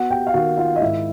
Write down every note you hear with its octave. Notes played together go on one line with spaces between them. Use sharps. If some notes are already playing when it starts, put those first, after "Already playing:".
Already playing: B3 F#4 F#5
G4 G5
F5
D#3 F#4 F#5
F4 F5
D#5
G#2 E4 E5